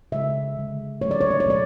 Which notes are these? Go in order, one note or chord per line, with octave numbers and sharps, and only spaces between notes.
C#3 G#3 E5
D3 G#3
D3 F#3 A3 C#5
D5
C#5
D5
C#5
B2 F#3 A3 D5